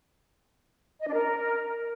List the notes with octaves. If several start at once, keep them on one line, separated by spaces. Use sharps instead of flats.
D#5
D4
A#4